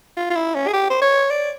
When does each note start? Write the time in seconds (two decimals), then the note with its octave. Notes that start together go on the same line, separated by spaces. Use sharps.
0.17 F4
0.30 F4
0.36 E4
0.55 C#4
0.68 G#4
0.74 G4
0.90 C5
1.02 C#5
1.30 D5